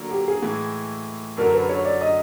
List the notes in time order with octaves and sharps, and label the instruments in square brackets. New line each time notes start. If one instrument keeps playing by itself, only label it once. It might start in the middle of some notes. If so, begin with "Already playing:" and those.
Already playing: [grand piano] D3 F#3 A#3
[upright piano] G4
G#4
[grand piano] A2 E3 G#3
[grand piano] F#2 D3 F#3 [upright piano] A#4
[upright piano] B4
C#5
D5
D#5